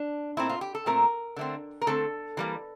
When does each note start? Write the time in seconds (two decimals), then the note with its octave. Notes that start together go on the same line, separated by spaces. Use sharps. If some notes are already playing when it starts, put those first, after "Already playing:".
Already playing: D4
0.37 A#2 A3 C4 E4
0.49 F4
0.61 G4
0.75 A4
0.86 A#2 A3 C4 A#4
1.36 D3 A3 C4
1.81 A#4
1.87 D3 A3 C4 A4
2.37 E3 G3 A#3